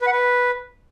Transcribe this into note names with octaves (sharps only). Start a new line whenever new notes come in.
B4
F#5
B4